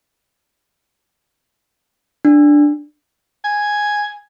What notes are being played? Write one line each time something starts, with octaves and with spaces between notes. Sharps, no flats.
D4
G#5